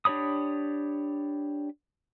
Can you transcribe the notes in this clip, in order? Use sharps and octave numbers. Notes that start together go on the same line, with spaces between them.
D4 G4 C#5 B5 D#6